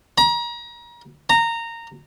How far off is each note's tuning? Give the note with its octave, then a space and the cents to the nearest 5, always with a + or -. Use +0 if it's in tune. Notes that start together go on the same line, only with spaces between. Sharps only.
A#5 +35
A#5 -15